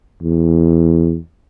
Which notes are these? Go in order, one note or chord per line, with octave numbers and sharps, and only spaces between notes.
E2